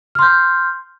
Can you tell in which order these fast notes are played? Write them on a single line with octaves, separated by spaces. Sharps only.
F6 C6 G6